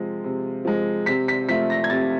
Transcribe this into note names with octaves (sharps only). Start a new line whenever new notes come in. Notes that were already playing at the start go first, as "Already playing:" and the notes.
Already playing: C3 F3 G#3
C3
F3 G#3
C3 B6
B6
F3 A3 B6
A#6
G#6
C3 A6